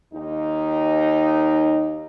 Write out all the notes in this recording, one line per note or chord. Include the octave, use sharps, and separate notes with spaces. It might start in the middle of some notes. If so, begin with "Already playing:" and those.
D#2 D#4